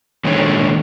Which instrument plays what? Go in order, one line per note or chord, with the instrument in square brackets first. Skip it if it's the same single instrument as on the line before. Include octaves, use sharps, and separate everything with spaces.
[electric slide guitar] A#2 D#3 G#3 A3 D4 C#5